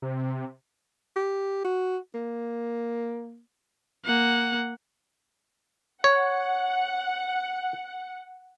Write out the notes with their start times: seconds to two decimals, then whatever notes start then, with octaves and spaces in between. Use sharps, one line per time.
0.02 C3
1.16 G4
1.64 F#4
2.15 A#3
4.05 A#3 F#5
6.04 C#5 F#5